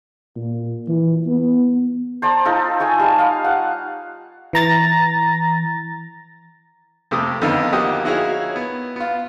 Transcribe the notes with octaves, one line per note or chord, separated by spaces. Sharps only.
A#2
E3
B3
C5 D5 A5 A#5
D#4 F4 A4
C#5 D#5 G5 G#5
G3 G#5 A5
F5
F#5
E3 A#5 A6 A#6
F2 C3 A3 G4 D6 D#6
F2 D3 D#3 B3 D#4 F4
F3 A#3 G4 D#5 F#5 D#6
D#4 E4 F#4 G#4 C#5 F5
B3
B3 F4